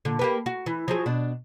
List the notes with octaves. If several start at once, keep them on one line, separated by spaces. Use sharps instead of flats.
A#2 D3
A#3 G4 B4
F#4
E3
F3 F#3 G#4
B2 D4